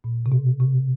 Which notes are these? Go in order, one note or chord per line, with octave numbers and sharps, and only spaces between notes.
A#2
C3
B2
C3